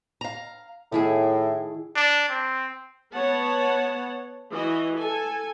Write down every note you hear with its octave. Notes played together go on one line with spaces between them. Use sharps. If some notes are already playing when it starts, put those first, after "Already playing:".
F5 A#5
A2 D#3 E4 G#4
D4
C4
B3 C#5 F#5 A5
E3 F#4 D#5
A4 G#5